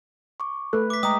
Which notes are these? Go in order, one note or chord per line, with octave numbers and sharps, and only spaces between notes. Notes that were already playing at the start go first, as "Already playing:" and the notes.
C#6 D6
A3 A4 B4 F#6
D6 B6
G#3 D#5 G5 A#5 D#6